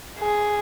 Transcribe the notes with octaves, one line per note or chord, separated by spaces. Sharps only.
G#4